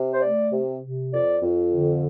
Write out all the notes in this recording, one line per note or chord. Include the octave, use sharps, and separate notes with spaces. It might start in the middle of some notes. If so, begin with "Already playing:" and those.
Already playing: C3
C5
A3 D5
C3
C3
F2 D5
F2
D3